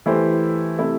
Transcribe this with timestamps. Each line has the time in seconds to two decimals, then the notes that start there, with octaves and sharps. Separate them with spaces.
0.06 E3 A3 E4 G4 C5
0.79 C3 A3 E4